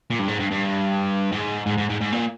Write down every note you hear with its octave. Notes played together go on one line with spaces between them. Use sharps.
A#2
G2
G#2
G2
G2
G#2
G#2
G#2
G#2
G#2
A#2